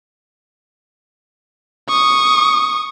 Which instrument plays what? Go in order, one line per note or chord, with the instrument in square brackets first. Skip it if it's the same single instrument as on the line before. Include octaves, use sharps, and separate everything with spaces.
[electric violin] C#6 D#6